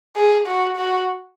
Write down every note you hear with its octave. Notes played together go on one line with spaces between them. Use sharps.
G#4
F#4
F#4